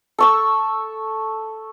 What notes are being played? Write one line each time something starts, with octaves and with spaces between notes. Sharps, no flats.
A4 C#6 E6